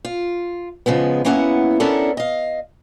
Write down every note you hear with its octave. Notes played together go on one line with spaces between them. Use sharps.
F4
C#3 F3 G#3 B3
A#3 B3 C#4 E4 F5 F#5
B3 C#4 D4 E4 A4 A#4
D#5 F5